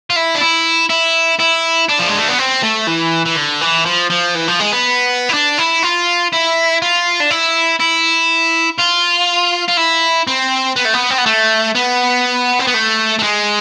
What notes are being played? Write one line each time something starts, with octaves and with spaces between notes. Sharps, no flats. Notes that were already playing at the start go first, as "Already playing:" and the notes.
F4
E4
D4
E4
E4
E4
D4
F3
G#3
A3
B3
C4
A3
E3
E3
D3
E3
F3
F3
E3
F3
G#3
B3
E4
D4
E4
F4
E4
F4
D4
E4
E4
F4
F4
E4
C4
B3
A3
B3
C4
B3
A3
B3
C4
B3
A3
A3
G#3